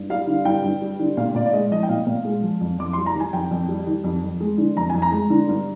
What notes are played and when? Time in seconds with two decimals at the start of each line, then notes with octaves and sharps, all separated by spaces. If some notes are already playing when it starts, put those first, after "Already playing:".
Already playing: G2
0.10 G3 F5
0.27 D3
0.45 G2 G5
0.64 G2
0.82 G3
1.00 D3
1.17 A#2 F5
1.35 A#2 D5
1.46 D5
1.53 G#3 D#5
1.71 F3 D#5
1.83 G5
1.89 A#2 F5
2.07 A#2
2.25 G#3
2.43 F3
2.61 F2
2.78 F2 D6
2.93 G3 C6
3.06 A#5
3.15 D#3
3.20 G#5
3.33 F2 G5
3.51 F2
3.69 G3
3.87 D#3
4.04 F2
4.23 F2
4.41 G#3
4.58 D3
4.77 F2 A#5
4.90 F2 G#5
5.02 A#5
5.12 G#3
5.30 D3
5.49 G2